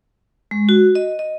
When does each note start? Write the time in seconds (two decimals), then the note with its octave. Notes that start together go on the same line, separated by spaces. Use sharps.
0.51 G#3
0.69 F#4
0.95 D#5
1.19 D#5